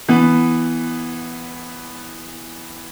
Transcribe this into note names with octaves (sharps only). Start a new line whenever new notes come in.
E3 B3